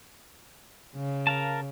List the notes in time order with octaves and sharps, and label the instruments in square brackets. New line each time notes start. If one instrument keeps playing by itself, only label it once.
[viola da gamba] C#3
[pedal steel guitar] A#4 F5 A5